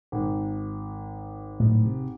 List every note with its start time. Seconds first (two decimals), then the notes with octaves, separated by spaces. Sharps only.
0.12 G#1
1.60 A2 F#3
1.85 C3